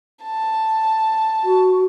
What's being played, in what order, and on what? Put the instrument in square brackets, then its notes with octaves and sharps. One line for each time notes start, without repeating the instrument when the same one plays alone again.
[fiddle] A5
[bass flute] F#4